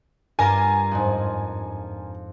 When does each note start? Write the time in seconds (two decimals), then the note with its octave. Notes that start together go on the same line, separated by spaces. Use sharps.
0.39 G2 D4 F4 A#4 G#5
0.91 F2 G#2